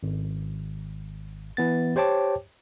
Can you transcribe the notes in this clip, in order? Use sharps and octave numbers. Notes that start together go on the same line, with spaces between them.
G#1
E3 B3 A6
G4 C5 C#5 G5 A5 D6